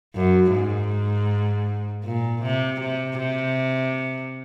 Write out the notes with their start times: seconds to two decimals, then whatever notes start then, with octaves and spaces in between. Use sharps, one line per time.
0.15 F#2
0.53 G#2
2.04 A#2
2.43 C3
2.80 C3
3.18 C3